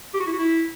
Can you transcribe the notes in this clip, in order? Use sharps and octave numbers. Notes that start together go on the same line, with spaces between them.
G4
F#4
E4
F#4
E4